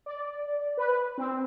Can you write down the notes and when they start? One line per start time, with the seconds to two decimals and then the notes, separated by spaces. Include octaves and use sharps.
0.06 D5
0.77 B4
1.18 C4